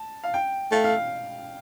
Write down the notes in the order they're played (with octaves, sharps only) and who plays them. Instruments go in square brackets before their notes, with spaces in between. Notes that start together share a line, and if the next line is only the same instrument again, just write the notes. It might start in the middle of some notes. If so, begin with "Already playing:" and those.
Already playing: [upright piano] A5
F5
G5
[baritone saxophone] A3 [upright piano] F5
[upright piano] F5